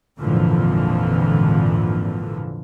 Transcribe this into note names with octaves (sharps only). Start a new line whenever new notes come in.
G#1 F2 A#2 D3 E3 F3